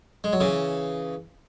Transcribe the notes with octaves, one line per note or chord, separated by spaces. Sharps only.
G#3
F#3
C#3 E3